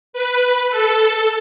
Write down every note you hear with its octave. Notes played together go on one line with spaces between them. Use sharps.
B4
A4